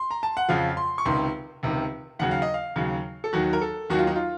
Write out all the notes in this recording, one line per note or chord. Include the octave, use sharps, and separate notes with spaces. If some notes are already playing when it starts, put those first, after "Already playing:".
Already playing: C6
A#5
A5
F#5
F2 C#3 F3 F5
C6
C#6
C#2 C3 D#3 C6
C#2 C3 D#3
D#2 C#3 F#3 F#5
F5
D#5
F5
D#2 C#3 F#3
A4
D#2 D#3 F#3 F#4
A#4
A4
D#2 D#3 F#3 F#4
F4
D#4
F4